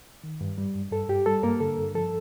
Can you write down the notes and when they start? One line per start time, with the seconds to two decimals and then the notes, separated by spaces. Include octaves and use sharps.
0.24 D#3
0.41 G2
0.58 G3
0.75 G2
0.92 G2 A4
1.09 G2 G4
1.26 G3 A4
1.43 G2 A#3 A#4
1.60 D3 A4
1.78 G2
1.95 F3 A4